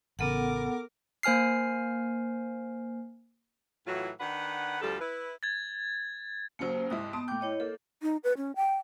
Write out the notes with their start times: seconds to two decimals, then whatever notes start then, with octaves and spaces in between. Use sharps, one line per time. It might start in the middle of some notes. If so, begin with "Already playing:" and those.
0.19 A1 C#3 B3 A4 A#4 F#5 D6
1.23 A#3 C5 G#5 F6 C7
3.87 A2 E3 F#3 F4 F#4
4.20 D#3 D4 B4 F#5
4.82 D2 F3 G3 A4
5.00 E4 B4
5.43 G#6 A6
6.59 D#2 C#3 F#3 A#3 C5
6.90 C2 G#2 E4 D#6
7.13 B3 A5 C6 D#6
7.28 A2 G5 D6 G6
7.41 E4 C#5 D#5
7.60 A#3 A4
8.02 D#4
8.24 B4
8.37 C#4
8.56 G5